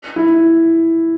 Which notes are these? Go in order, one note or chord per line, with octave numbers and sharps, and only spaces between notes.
E4